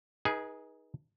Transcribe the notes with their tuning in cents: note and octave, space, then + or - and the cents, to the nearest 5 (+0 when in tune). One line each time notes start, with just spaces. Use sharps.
D#4 +25 G#4 +0 B4 -30